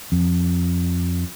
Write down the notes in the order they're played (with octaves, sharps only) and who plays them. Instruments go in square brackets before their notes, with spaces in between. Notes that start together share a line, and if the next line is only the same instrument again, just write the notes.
[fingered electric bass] F2